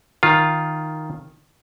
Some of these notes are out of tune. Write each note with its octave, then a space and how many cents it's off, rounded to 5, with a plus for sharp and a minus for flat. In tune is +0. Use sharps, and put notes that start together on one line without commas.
D#3 +0 F4 +0